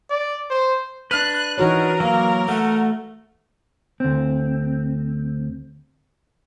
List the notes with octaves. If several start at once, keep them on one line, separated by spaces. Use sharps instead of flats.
D5
C5
D4 B4 F#6
E3 D#4 F#4 A#4 C#5
F#3 A#3 F5
A3 F#5
D2 C4